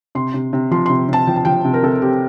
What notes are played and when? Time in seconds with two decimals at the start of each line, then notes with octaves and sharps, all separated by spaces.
0.15 C3 C6
0.34 C3
0.53 C3
0.71 F3 C6
0.86 C6
0.90 C3
1.09 C3 A5
1.27 F3 G5
1.36 A5
1.45 F3 G5
1.64 C3
1.74 A#4
1.83 C3 A4
2.02 C4 G4